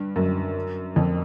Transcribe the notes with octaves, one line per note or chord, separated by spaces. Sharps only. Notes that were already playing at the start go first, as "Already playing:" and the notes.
Already playing: G2
F#2
F2